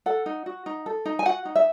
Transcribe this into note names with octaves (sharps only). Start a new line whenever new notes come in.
A4 F#5
D#4
F#4
D#4
A4
D#4
G#5
F#4 F#5
D#4
E5